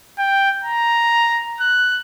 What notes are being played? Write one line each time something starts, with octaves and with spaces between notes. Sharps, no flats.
G5
A#5
F#6